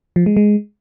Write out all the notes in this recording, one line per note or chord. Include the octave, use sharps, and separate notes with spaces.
F3
G#3
G#3